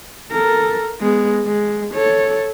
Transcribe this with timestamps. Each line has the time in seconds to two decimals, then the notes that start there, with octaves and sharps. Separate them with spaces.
0.32 A4 A#4
1.01 G#3 B3
1.47 G#3
1.94 A4 C#5